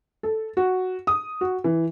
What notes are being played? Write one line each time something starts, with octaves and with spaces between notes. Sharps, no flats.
A4
F#4
D#6
F#4
E3